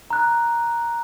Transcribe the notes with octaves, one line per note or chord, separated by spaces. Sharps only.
A#5 F#6